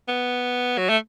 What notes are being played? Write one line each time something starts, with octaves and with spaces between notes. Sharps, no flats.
B3
F#3
A3